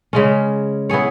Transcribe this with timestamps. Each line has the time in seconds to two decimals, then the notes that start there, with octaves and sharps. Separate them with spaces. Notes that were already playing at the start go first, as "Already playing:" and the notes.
0.13 C#3 G#3 C#4
0.89 B3 E4 G#4 C#5